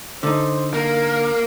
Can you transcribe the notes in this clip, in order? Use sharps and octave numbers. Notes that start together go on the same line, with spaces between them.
D3 D#4 C5
A#3 A#4